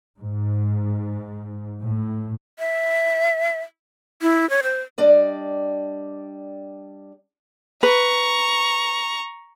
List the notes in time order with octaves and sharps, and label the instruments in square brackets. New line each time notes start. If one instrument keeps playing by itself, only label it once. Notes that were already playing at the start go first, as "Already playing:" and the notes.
[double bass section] G#2
A2
[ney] E5
E4
C#5
C5
[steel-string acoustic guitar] G3 D4 D5 D#5
[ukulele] B4 [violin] A#5 C#6